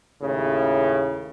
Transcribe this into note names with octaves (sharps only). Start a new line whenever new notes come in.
D#2 A2 C#3